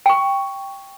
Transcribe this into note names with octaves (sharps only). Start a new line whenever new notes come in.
G5 C#6